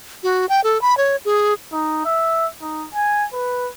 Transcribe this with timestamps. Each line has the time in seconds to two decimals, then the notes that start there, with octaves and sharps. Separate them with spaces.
0.23 F#4
0.49 G5
0.64 A4
0.81 B5
0.97 C#5
1.25 G#4
1.72 D#4
2.05 E5
2.61 D#4
2.94 G#5
3.33 B4